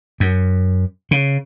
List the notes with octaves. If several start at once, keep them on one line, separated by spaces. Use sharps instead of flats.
F#2
C#3